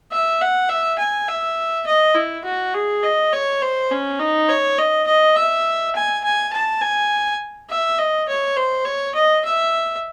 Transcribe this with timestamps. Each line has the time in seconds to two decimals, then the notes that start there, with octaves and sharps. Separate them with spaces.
0.11 E5
0.41 F#5
0.69 E5
0.98 G#5
1.28 E5
1.86 D#5
2.15 E4
2.44 F#4
2.74 G#4
3.03 D#5
3.32 C#5
3.62 C5
3.91 C#4
4.19 D#4
4.49 C#5
4.78 D#5
5.07 D#5
5.36 E5
5.95 G#5
6.24 G#5
6.52 A5
6.81 G#5
7.70 E5
7.98 D#5
8.28 C#5
8.56 C5
8.85 C#5
9.14 D#5
9.44 E5